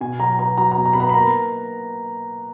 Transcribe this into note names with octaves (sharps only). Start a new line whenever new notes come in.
B2 G#5
F#3 A#5
B3 A#5
F#3 A#5
A#5
B2
A#5
B3 B5
A#5
B5
A#3 A#5